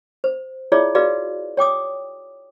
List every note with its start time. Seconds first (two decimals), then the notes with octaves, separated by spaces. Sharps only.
0.24 C5
0.72 E4 F4 G#4 C#5 D5 E5
0.95 F#4 G#4 B4 D5 D#5 F5
1.57 C#5 G5 D6 D#6